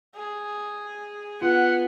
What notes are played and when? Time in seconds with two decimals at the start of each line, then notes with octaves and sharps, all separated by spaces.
0.15 G#4
1.42 B3 F4 F#5